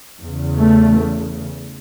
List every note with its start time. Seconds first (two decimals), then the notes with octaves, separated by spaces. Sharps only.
0.21 E2
0.26 C#3
0.59 A3